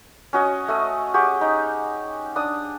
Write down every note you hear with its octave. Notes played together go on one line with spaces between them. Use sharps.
C#4 F#4 D#5
A3 D#5
G4 G#4 F#5 C#6
D#4
D4 D#6